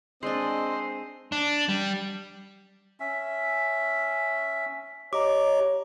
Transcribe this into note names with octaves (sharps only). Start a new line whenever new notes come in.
G#3 C4 D4 C5 D#5
D4
G3
C#4 E5
G4 C#5 D#5 A#5 D6